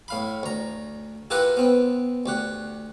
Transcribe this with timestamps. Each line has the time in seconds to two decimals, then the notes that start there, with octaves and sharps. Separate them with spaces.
0.08 A2 F5 B5
0.43 D2 A#5
1.30 E4 F4 G4 A#4 B4 F#5
1.57 B3 C4
2.26 D2 G4 F#5